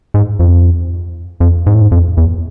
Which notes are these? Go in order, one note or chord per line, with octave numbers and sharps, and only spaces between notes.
G#2
F2
F2
G#2
A2
G#2
F2
E2